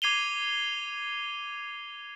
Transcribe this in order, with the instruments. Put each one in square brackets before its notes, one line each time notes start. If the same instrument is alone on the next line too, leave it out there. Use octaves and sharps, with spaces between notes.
[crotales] D6 G#6 C7 D#7 F7 G7